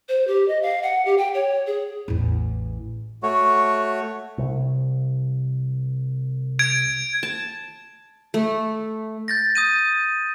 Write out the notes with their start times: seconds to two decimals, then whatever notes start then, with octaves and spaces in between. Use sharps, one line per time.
0.09 C5
0.27 G4
0.48 D#5
0.62 F5
0.83 F#5
1.05 G4
1.18 G5
1.34 C#5
1.67 G#4
2.08 A1 E2
3.23 A3 F#4 C#5
4.38 C2
6.59 G#6 D7
7.23 A5
8.34 A3
9.28 G6 A6 A#6
9.55 D#6 G6 D#7